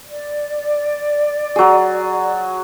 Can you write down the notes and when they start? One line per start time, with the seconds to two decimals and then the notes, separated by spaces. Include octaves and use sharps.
0.05 D5
1.56 F#3 G#4